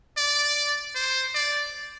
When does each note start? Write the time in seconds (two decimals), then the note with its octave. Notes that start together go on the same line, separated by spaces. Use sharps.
0.17 D5
0.95 C5
1.35 D5